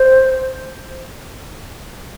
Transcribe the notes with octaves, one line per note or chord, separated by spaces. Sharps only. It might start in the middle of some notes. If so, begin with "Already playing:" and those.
Already playing: C5